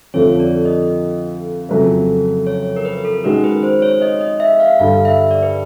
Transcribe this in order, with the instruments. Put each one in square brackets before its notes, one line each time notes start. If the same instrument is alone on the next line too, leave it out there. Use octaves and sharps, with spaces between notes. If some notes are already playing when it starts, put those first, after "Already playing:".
[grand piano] F2 D3 F3 A3 [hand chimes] C#5
[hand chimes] D5
D#5
[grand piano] F2 C#3 F#3 A3 C#4
[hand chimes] C#5
A#4
B4
A4
[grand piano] D#3 G#3 C#4 F#4 [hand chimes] A#4
[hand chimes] B4
C5
C#5
D#5
D#5
E5
F5
[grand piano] G2 D3 G3 [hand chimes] F5
[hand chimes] E5
D5
B4